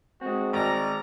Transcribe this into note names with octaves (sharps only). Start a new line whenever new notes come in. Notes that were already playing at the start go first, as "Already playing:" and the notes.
G#3 C4 F#4
G#1 D5 A#5